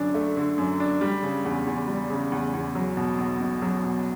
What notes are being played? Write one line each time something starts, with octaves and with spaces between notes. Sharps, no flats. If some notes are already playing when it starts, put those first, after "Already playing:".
Already playing: F#2 D3 D4
A3
D3
F#2
D4
G3
C#3
E2
E2
G3
C#3
E2
E2
F#3
B2
B1
B1
F#3
B2